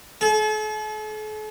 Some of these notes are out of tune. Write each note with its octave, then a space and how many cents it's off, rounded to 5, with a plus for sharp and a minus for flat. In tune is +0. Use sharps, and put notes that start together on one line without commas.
A4 -45